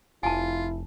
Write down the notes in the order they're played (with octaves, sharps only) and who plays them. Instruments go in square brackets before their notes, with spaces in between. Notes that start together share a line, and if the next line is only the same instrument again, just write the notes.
[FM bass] F1 [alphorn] E4 [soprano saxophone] F4 [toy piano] G#5 A5